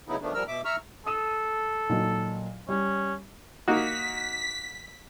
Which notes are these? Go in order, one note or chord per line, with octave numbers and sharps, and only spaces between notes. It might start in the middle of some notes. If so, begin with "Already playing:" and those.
C#3 F#3 B3 D#4 E4
D#3 F3 A3 B3 D4
F3 G3 A#4 E6 F6
B2 E5 D6
E5 A#5 C#6 E6 F6
A4 D#6 D#7 E7
A#2 D#3 F#3
G3 C#4
A#3 D#4 F#4 B6